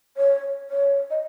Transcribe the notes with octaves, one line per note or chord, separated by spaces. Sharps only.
C#5
C#5
D#5